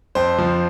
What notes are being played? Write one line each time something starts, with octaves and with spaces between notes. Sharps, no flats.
F2 C5
F3